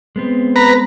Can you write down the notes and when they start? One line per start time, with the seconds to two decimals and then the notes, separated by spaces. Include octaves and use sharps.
0.16 G#3 B3 C4
0.56 B4 A#5